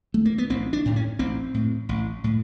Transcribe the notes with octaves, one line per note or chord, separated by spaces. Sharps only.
A3
A#3
B3
A1 C4
D4
A2
C#4
A1 C4
A2
A1
A2